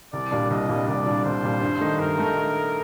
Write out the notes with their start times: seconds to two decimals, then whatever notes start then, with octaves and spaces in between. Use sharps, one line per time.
0.13 C2 D5
0.31 A#2 G3 D4
0.50 C2 D#5
0.69 A#2 G3 D4
0.87 C2 D5
1.06 A#2 G3 D4
1.24 C2 C5
1.44 A#2 G3 D4
1.62 G2
1.81 D#3 A3 D#4
1.99 G2 A#4
2.18 D#3 A3 D#4